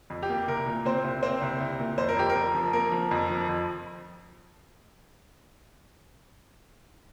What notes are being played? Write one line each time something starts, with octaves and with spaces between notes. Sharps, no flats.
F2
G4
A#3
C2 A#4
A#2
A#2 C4 C5
C2
A#3 C4 C5
C2
C2
A#2
F2 C5
A#4
F2 G4
A#4
F2
F3
A#3 A#4
F3
F2
F3
F2